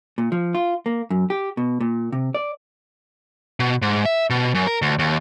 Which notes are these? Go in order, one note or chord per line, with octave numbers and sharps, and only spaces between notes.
A#2
F3
F4
A#3
F#2
G4
B2
A#2
C3
D5
B2
G#2
E5
B2
F#2
A#4
D2
D#2